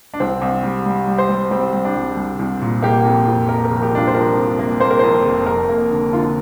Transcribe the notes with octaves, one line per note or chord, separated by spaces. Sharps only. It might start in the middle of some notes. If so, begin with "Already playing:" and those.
D4
C2 C4
C2
G3
G3
G3
C5
G3
G3 C4
G3
D4
C2
C2
C2
A#2
A#3 G4
F2
F2
A#3 A#4
A#4
F1
G4
F2 D4
F4
C5
F3 A#4
F2
A#3
A#3 C5
A#4
F2 C5
F1
F2 A#4
A#3
D3
D3 F4